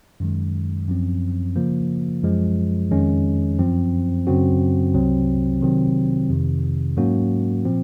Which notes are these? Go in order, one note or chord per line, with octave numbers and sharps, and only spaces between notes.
F#2 D#3 G#3
F#2 F3 C4
C#3 F3 A#3
F#2 F3 G#3
F2 D#3 G#3 C#4
F#2 F3 C4
F#2 C#3 F#3 C4 F#4
C2 C3 F#3 C4
C3 D#3 F#3 C4
F2 C3 D#3
G#2 F#3 A#3 C#4 F#4
A#2 F3 C4